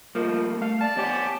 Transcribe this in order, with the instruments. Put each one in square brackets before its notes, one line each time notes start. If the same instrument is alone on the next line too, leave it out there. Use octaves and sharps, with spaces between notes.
[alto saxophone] F3 [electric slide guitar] G3 A3 A#3
[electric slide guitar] A3 [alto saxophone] F5
[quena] D5 [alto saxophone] A5
[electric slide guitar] B3 C#5 G#5 [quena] G4